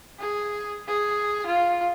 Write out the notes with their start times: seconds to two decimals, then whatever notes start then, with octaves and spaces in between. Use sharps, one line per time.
0.19 G#4
0.88 G#4
1.46 F4